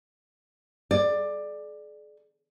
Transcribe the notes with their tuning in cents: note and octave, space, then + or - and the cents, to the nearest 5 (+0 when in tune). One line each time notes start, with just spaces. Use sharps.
G#4 +45 D5 +15